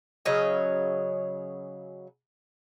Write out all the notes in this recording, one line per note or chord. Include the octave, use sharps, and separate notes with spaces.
C#3 F#3 C#5 D#5